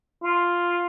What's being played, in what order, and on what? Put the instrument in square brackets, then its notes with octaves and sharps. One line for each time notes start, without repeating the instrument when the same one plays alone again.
[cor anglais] F4